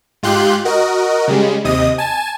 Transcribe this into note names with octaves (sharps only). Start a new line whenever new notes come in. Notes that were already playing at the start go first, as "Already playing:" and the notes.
G#2 F4 G4 C6 F#6 G6
F#4 A#4 D#5
C#3 G3 G#3
D#2 C3 D#5 D#6
G#5 A5